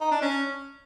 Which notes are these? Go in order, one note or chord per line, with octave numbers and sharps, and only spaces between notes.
D#4
D4
C#4